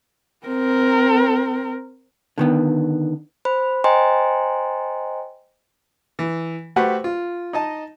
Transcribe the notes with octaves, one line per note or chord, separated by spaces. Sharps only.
C4 A#4
D3 D#3 B3
C5 B5
C5 D#5 G5 G#5 A#5 C6
E3
A3 F#4 G4 B4 C5 F#5
F4
D#4 D#5 A5